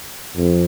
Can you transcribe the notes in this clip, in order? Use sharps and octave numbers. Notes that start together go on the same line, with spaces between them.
F2